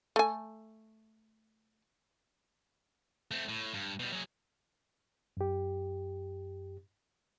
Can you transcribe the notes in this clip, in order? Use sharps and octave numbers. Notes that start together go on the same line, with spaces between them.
A3 G#5
A3 C4
A2
G2
B2 G3
F#3 G#4
F#2 G4